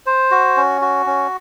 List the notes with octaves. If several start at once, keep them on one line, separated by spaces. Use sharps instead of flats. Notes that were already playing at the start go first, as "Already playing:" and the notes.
C5
F#4
C#4
F#4
C#4